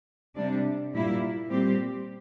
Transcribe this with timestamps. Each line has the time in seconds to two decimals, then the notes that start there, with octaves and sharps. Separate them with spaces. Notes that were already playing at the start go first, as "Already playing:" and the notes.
0.36 C3 G3 D4
0.93 A#2 G3 A#3 E4
1.50 A#2 G3 C4 G4